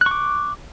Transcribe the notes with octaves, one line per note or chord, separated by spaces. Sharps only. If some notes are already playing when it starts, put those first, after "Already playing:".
C#6 D6 F#6